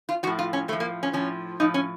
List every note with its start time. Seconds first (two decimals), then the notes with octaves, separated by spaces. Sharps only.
0.09 F4
0.23 F3 F#4
0.27 A2
0.39 F4
0.53 C#4
0.68 A2 A3
0.73 F3
0.80 A#3
1.03 C#4
1.13 A2 F3 C#4
1.60 A2 F3 D#4
1.74 C#4